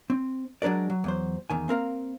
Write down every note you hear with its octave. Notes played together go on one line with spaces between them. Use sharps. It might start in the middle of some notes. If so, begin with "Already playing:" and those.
C4
F#3 G#3 D4 A#4 D5
F#3
E2 F#3 C5
E2 D#3 G#5
A#3 C4 A#4 F5